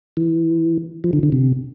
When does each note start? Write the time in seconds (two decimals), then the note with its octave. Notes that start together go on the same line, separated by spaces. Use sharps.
0.17 E3
1.04 F3
1.13 D3
1.23 D3
1.32 C3